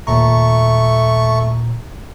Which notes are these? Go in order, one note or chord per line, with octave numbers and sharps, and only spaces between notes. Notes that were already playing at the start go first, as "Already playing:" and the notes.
D#2 A#2 A3 A#5 C#6